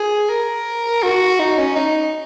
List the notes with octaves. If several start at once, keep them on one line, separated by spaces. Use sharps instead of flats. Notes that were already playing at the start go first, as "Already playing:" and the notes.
Already playing: G#4
A#4
F#4
D#4
C#4
D#4